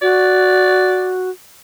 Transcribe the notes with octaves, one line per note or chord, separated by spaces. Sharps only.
F#4 D5